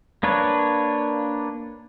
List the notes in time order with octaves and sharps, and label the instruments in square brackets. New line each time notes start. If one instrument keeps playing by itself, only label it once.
[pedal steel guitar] A#3 D4 B4 C#5